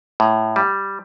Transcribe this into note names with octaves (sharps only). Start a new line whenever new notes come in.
A2
G3